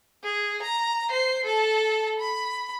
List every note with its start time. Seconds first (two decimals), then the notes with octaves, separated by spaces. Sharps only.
0.23 G#4
0.62 A#5
1.10 C5 C7
1.45 A4 A5
2.20 B5